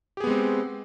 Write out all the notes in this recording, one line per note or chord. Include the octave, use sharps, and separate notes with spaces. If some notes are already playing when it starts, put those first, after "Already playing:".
G#3 B3 C4 G4 G#4